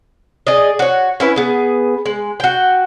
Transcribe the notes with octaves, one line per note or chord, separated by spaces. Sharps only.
G#4 D5 D#5
F#4 C#5
C#4 E4 B4
B3 G#4
G#3
F#4 G5